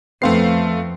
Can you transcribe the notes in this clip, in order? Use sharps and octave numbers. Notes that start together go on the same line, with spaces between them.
F2 A3 B3 C4 F5 C7